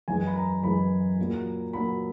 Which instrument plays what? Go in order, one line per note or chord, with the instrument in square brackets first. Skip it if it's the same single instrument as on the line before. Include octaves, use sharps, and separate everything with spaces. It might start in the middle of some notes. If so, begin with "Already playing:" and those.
[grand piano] F#2 E3 G#3 G#5
B5
A#5
F#2 E3 G#3 B5
A#2 F#3 A#3
A#2 F#3 A#3 B5